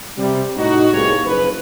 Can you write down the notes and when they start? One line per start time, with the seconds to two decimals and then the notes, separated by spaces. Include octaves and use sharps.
0.18 C3 G3
0.57 A2 D#4 F#4
0.93 C2 A#3 B3 G4 G#4 C#5
1.25 F#1 F3 G#4 B4